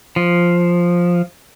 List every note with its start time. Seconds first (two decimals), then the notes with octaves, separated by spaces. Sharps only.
0.16 F3